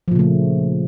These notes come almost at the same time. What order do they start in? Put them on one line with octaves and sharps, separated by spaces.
F3 A#2 C#3 A3